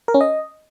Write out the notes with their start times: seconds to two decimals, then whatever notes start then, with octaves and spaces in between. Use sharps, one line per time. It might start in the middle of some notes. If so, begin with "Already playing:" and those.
0.08 A#4
0.14 C#4
0.21 D#5